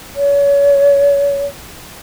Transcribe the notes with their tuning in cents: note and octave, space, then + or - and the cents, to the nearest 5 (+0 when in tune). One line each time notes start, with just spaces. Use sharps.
C#5 +30